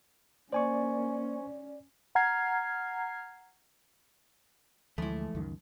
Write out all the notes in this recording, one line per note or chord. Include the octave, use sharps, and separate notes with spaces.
A#3 C#4 C5 D5 G#5 C#6
F#5 A#5 F6 G#6 C7
D2 E3 F3 G#3 A3 E4
C#2 F#2 D#3